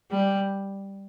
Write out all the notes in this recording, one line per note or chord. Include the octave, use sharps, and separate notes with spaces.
G3